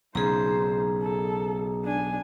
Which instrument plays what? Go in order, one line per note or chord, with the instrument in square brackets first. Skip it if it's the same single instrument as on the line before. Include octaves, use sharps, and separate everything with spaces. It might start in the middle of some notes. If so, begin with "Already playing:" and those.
[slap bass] B1 C#3 [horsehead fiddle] D#4 C5 [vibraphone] G#4 A#5
[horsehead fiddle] A4
D4 G#5